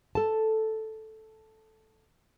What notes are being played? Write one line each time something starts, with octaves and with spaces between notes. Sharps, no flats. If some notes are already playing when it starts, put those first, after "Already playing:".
A4 A5